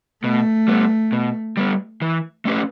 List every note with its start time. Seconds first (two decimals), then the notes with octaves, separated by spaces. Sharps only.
0.24 B2 A3
0.68 G3 B3
1.12 B2
1.57 G3 B3
2.02 E3
2.45 A3 C#4 G4 B4